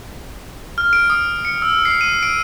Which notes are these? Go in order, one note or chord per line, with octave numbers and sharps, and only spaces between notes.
F6
D7
D#6
C#7
E6
C7
D#7
D7